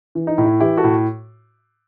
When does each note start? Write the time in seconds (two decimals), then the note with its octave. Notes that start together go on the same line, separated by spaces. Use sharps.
0.15 E3
0.27 D#4
0.38 A2
0.44 E4
0.60 E3 E4 G4
0.77 F#4 A4
0.84 A2